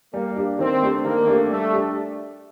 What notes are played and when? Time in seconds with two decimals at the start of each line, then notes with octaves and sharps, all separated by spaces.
0.14 G3 A#3
0.36 D4 G4
0.59 D#3 C4
0.82 A3 D4 G4
1.05 D#3 A#3
1.27 A3 D4 G4
1.50 G3 A3
1.73 D4 G4